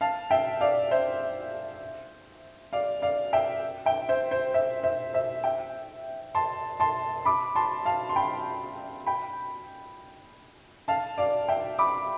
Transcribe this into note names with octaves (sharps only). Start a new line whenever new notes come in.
F5 A5
E5 G5
D5 F5
C5 E5
D5 F5
D5 F5
E5 G5
E5 G5
C5 E5
C5
C5 E5
C5 E5
C5 E5
E5 G5
A5 C6
A5 C6
B5 D6
A5 C6
F5 A5
C6
G5 B5
G5 B5
F5 A5
D5 F5
E5 G5
B5 D6